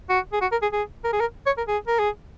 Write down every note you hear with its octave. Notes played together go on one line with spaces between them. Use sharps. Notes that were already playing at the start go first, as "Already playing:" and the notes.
F#4
G#4
F#4
A#4
G#4
G#4
A#4
G#4
A#4
C#5
A#4
G#4
A#4
G#4